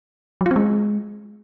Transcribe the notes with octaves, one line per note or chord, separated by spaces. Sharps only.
F#3
F4
C4
G#3